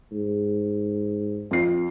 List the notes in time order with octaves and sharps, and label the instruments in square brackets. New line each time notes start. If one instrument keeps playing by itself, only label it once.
[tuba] G#2
[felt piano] F2 C7